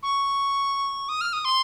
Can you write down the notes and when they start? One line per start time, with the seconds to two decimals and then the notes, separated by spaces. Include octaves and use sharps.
0.03 C#6
1.09 D#6
1.21 F6
1.33 D#6
1.45 C6